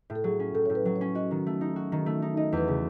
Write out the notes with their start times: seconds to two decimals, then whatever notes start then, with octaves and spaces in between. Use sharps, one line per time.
0.10 A2
0.16 A4
0.24 F#3 G#4
0.40 C#4
0.54 A2 A4
0.66 A2 C#5
0.75 B4
0.85 F#3
0.96 C#5
1.01 C#4
1.15 F#4 D#5
1.31 D#3
1.46 A3
1.61 D#4
1.76 F#4
1.92 D#3
2.06 A3
2.22 D#4
2.37 D#4 D#5
2.52 E2 B4
2.68 C#3